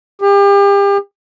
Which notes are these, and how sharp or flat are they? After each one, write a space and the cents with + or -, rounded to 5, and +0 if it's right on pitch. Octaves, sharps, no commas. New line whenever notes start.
G4 +35